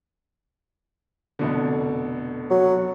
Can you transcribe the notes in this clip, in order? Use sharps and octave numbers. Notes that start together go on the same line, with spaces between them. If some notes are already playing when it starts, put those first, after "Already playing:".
F1 B2 D3
F#3